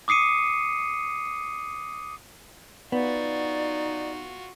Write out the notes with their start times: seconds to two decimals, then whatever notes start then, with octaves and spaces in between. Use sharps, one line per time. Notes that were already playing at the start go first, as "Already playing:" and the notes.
0.08 D6 D#6 C7 C#7 D#7
2.92 B3 D#4 F4 F#4 D5